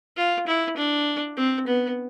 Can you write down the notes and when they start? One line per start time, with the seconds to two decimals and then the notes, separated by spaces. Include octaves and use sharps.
0.17 F4
0.47 E4
0.77 D4
1.37 C4
1.67 B3